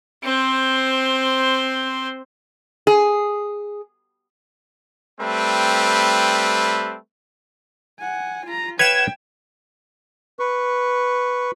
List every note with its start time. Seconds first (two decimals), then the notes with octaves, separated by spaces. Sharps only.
0.24 C4 C5
2.87 G#4
5.20 G3 A3 C4 B4
8.00 F#5 G#5
8.46 F4 A#5
8.79 B4 C#5 F5 G5 G#6 E7
10.39 B4 C#6